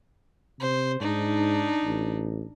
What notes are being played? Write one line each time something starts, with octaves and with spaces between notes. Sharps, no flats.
C3 C5
G#2 D4 D#4
A1